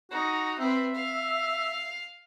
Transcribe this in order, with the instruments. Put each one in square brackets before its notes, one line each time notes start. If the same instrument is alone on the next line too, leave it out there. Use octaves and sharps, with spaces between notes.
[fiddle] D#4 [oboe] F#4
[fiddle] C4 B4 [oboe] E5
[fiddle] F5